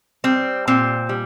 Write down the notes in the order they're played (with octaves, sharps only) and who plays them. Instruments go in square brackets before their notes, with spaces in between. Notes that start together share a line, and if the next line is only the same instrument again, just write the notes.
[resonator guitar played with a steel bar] G3 C4
A#2 C4
G3